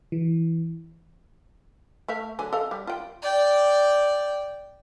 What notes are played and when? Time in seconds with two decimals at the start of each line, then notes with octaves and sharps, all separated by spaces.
0.12 E3
2.08 A3 E5 F5
2.39 D3 F#3 G#5
2.53 A4 D#5 F5
2.71 G3
2.87 F4 G5
3.22 D5 G5